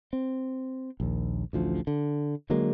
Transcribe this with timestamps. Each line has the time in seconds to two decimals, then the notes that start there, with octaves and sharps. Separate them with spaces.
0.13 C4
1.00 A#1 D#2
1.53 A1 D2 F3
1.87 D3
2.50 D3 F#3 G#3 A#3